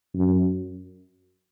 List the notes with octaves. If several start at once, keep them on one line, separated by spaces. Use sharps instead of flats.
F#2